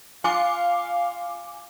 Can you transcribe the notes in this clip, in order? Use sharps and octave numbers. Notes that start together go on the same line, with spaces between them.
F4 F5 G#5 D6